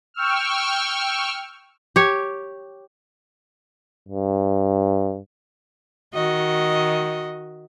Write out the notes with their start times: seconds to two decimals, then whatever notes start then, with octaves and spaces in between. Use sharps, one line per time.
0.14 G5 C#6 E6 F6
1.96 G4 C#5
4.08 G2
6.14 D#3 F#4 D#5